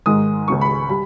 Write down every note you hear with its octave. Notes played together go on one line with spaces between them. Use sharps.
G#2 D#3 G#3 D#6
C#2 C#3 G#3 C#6
B5
G3 B5